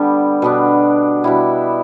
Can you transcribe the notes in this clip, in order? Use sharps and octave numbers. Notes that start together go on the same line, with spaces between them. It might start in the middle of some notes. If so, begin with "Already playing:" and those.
Already playing: D3 G3 B3
B2 B3 D4
B2 G3 E4